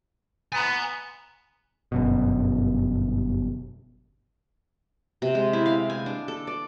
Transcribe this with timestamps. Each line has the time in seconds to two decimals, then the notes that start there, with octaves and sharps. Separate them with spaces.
0.52 B3 G#5 A#5
1.92 G1 F#2 B2
5.22 C3
5.35 G#3
5.53 E4
5.66 F5
5.90 G#5
6.06 D4
6.28 A4
6.47 D5